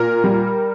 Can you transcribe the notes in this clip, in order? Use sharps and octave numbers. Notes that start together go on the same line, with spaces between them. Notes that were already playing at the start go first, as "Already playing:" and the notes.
Already playing: A#2 A#4
G3